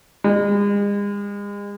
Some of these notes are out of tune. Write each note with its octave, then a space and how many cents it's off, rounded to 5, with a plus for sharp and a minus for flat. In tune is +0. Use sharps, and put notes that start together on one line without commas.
G#3 -40